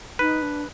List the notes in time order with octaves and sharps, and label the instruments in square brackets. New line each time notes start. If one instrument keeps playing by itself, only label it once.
[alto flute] D#4 [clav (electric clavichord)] B4
[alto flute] D4